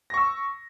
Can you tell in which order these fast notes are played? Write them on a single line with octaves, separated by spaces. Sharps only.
A#6 C#6 E6